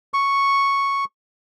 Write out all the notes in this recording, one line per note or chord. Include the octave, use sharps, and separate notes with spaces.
C#6